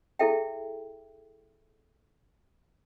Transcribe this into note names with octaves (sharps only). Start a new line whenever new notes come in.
E4 G#4 A4 E5 G5